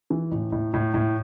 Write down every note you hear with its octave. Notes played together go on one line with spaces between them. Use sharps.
E3
A2
A2
A2
A2